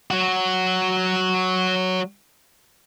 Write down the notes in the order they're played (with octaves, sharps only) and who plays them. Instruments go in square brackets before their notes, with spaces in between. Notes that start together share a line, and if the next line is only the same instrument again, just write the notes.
[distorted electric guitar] F#3 F#4